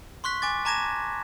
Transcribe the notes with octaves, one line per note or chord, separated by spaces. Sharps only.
C6 C#6 F#6 B6
G#5 D6 A6
A5 A#5 D6 G#6 A#6 E7